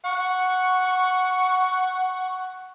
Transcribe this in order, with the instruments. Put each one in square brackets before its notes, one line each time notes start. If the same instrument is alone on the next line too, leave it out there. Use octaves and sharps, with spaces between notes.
[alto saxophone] F#5 [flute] C#6